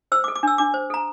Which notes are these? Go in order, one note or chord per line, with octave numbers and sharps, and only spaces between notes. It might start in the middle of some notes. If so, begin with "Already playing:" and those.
C5 E6
D6
A4
D6
D4 E6
D4 D6
C5
A4 A#5